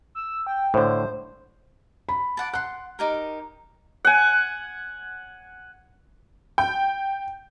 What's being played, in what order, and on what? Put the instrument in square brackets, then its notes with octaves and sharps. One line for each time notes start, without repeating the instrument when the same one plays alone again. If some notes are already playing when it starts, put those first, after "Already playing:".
[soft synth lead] E6
G5
[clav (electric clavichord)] A2 D3 [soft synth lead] C5
[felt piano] B5
[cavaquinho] D5 F#5 A5
[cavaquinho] F#5 C6 [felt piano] F#6
[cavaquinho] D#4 G4 A#4
[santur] F#5 G#5
[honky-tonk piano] G5